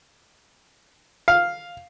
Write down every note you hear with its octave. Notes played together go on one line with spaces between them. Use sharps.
F5